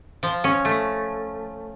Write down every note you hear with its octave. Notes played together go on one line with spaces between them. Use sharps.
F3
C#4
A3